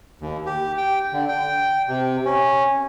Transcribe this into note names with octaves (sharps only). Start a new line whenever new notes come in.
D#2
G4
G5
D3
G5
C3
C#4